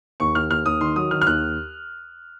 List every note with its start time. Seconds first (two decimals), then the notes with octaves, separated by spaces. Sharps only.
0.20 D#2 C#6
0.35 D#2 F6
0.50 D#2 F6
0.65 D#2 D#6
0.81 D#3 C6
0.96 F#3 D#6
1.11 D#3 F6
1.21 F6
1.26 D#2 F#6